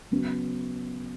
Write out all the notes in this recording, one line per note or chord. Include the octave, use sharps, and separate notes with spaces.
C#3 F#3 B3